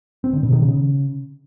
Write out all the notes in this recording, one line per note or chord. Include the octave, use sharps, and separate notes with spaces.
C4
D3
B2
D#3
C#3